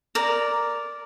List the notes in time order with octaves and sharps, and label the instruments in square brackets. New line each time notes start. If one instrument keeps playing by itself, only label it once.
[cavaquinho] A#4 D5